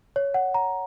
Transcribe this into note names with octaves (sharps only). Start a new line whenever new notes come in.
C#5
F#5
A#5